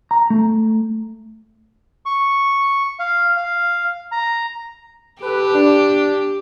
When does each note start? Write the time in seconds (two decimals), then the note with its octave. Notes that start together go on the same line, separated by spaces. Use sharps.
0.11 A#5
0.30 A3
2.06 C#6
2.99 F5
3.37 F5
4.12 A#5
5.22 G4 A4 B4
5.54 D4